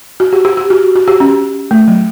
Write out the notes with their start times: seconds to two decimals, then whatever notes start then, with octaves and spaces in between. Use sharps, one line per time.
0.20 F#4
0.33 G4
0.45 G4
0.57 G4
0.70 F#4
0.96 F#4
1.08 G4
1.20 C#4
1.71 A3
1.88 F#3